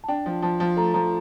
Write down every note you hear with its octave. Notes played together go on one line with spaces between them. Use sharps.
A5
D4 G5
F3
F3 A5
F3
A3 A#5
F3 A#5